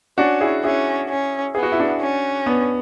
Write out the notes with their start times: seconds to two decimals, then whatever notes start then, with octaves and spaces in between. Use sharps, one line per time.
0.18 C#4 D4 F#4
0.41 E4 G#4
0.64 C#4 E4 G#4
1.09 C#4
1.55 B3 G#4
1.63 F#4
1.72 E4
1.79 D4 F#4
2.00 C#4
2.46 B3 D4